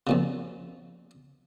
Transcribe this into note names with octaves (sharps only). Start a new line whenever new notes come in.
F2 A#2 C#3